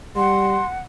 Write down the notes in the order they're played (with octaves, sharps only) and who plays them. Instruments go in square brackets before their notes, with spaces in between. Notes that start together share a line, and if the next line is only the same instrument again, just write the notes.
[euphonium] G3 [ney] F#5 [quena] C6